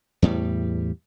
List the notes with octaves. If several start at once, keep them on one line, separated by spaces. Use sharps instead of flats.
E2 A2 G3